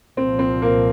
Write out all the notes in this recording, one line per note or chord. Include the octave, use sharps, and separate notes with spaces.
C2 A#2 F3 C4
C4
A#3